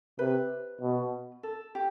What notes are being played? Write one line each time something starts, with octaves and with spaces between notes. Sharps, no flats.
C3 B4
B2
A4
G4